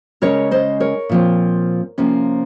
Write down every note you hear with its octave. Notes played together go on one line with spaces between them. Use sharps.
C#3 G#3 C#4 A#4 C#5
C5 D#5
A#4 C#5
A#2 F3 C4
C3 F3 A#3 C#4